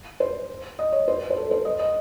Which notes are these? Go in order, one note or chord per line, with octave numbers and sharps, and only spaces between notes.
C5
D#5
C#5
C5
C5
A4
C5
D#5
D#5